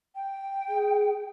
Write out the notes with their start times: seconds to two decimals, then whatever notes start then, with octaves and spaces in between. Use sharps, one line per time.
0.15 G5
0.69 G#4